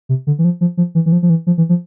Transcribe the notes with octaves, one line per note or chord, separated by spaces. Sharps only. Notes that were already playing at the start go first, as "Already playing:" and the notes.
C3
D3
E3
F3
F3
F3
E3
E3
F3
F3
E3
F3
E3
F3